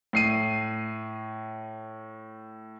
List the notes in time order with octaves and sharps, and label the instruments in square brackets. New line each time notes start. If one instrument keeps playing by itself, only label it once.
[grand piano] A2 C7 D#7